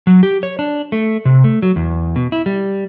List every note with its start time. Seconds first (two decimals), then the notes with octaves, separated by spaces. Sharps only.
0.07 F#3
0.23 G4
0.43 C#5
0.59 D4
0.92 A3
1.25 C3
1.44 A3
1.62 F#3
1.76 E2
2.16 B2
2.32 E4
2.46 G3